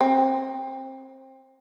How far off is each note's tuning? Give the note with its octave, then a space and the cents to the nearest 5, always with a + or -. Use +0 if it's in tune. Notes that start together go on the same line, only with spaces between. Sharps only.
C4 +25